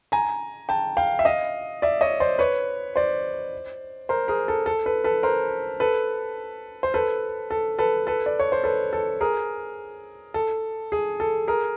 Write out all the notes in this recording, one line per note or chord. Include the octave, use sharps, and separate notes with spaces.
G#5 A#5
G5 A5
F5 G5
E5
D#5 F5
D5 E5
C#5 D#5
C5 D5
B4 C#5
C5 D5
A#4 C5
G#4 A#4
A4
A4
A4 B4
A4 B4
A#4 C5
A4 B4
C5
A4 B4
A4
A4 B4
A4 B4
D5
C#5
C5
A4 B4
A4
G#4 A#4
A4
G#4
A4
G#4 A#4